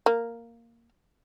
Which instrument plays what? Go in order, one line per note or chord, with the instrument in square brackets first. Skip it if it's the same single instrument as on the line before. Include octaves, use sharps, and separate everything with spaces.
[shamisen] A#3